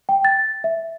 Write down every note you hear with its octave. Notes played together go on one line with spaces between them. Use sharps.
G5
A6
E5